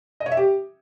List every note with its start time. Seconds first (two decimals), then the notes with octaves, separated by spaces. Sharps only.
0.20 D#5
0.26 C#5
0.32 E5
0.37 G4